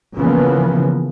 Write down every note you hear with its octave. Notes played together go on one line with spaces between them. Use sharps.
C#3 E3 F3 A#3 B3